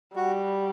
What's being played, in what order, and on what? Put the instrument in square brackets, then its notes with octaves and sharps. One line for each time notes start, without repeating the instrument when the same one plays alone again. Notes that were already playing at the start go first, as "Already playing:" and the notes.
[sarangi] G3 [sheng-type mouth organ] F#4